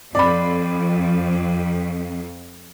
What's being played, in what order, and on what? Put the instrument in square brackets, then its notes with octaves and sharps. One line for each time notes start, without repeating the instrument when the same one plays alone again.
[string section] F2 [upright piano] D5 B5